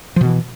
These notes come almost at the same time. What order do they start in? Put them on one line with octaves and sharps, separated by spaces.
F3 B2 E3